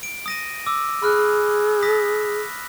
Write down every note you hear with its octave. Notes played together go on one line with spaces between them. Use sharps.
D7
D#6 A#6 D#7
D6 E6
G#4 B5 F6 F#6
D#6 A#6 B6